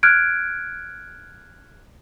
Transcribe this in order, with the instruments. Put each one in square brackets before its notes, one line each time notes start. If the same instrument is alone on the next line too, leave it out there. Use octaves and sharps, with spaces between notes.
[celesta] F6 F#6 G#6 D7